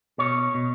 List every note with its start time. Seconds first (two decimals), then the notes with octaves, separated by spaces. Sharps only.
0.18 B2 C#5
0.54 B2